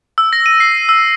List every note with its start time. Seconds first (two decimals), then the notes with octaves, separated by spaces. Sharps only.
0.18 E6
0.33 A#6
0.46 D#7
0.60 C7
0.89 E6